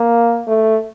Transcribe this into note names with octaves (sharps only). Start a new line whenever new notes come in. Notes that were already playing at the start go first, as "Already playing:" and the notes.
Already playing: A#3
A3